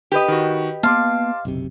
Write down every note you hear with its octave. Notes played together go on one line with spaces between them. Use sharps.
G4 B4 D#5
D#3 F#4
A#3 B3 F5 A5 C6 D6
F#1 B1 C3